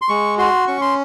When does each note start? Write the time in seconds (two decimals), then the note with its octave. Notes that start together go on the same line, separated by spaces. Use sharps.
0.02 C6
0.09 G#3 C#6
0.38 F#4 C6
0.67 C#4 C#6
0.81 C6